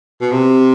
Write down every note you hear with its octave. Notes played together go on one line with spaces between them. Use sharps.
B2
C3